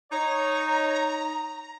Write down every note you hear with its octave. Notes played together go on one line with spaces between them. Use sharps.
D#4 C#5 A#5